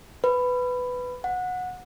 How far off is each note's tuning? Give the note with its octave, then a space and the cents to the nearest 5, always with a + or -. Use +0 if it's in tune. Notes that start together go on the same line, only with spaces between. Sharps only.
B4 +10
F#5 -20